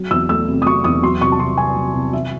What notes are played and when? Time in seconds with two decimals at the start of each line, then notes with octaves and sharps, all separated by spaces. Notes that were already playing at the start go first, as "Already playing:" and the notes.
Already playing: F#3
0.11 E2 E6
0.29 A3 E6
0.48 C3
0.62 D#6
0.66 F#3 C#6
0.84 E2 D#6
1.02 F#3 C6
1.21 C2 C#6
1.32 A5
1.39 C2 C6
1.57 C3 G#5
1.76 F#3
1.95 C2
2.13 E3 E5